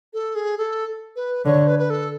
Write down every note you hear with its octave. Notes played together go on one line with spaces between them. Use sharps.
A4
G#4
A4
B4
D3 C#5
B4
B4
A4